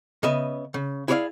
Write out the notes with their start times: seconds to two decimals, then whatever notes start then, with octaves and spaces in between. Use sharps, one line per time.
0.23 C#3 B3 D#5 E5
0.74 C#3
1.08 E4 G#4 A4 C#5 D5 F5